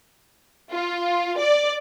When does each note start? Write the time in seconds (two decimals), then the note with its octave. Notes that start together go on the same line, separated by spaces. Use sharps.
0.72 F4
1.39 D5